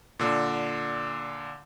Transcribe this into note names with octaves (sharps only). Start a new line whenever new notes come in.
A#2 D3